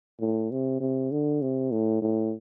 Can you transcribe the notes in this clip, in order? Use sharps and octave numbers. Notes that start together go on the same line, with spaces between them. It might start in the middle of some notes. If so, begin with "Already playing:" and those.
A2
C3
C3
D3
C3
A2
A2